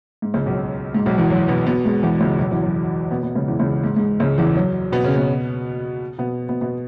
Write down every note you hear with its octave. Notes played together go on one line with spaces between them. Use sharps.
G#2
C#2 C#3
B1 B2
G#2
B1 B2
E2 E3
F#2 F#3
B2 B3
B2 B3
G#2 G#3
E2 E3
C#2 C#3
B1 B2
E2 E3
F#2 F#3
B2 B3
B2 B3
C#2 C#3
E2 E3
C#2 C#3
G#2
G#2 G#3
C#2 C#3
E2 E3
F#2 F#3
B2 B3
C#3 C#4
B2 B3
B2 B3
B2 B3
B2 B3